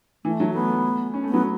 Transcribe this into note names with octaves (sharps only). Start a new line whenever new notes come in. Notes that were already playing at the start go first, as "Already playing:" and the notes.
E3 A3
F#3
A3 B3
C#4
A3
F#3 B3